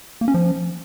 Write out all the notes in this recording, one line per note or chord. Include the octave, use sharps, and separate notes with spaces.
A#3
C#4
F3